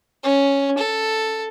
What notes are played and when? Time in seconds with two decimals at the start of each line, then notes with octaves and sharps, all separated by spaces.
0.23 C#4
0.78 A4